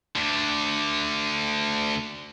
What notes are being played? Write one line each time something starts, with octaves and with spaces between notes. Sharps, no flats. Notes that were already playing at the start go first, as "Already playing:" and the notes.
D2 D3